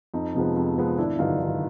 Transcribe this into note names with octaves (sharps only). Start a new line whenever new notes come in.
F2 D#4
C3 F3 G#3 B3
F2
C3 F3 G#3 B3
G#1 D4 E4
G2 D3 F#3 D#4 F4
G#1 D#4